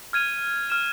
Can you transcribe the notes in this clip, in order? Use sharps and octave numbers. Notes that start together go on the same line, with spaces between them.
F6 G#6 D#7 F7
F6 E7